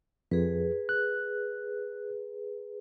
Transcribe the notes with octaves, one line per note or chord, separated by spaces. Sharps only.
F2 G#4 B4
F#6